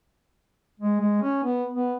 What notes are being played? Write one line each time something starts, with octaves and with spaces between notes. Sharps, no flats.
G#3
G#3
C#4
B3
B3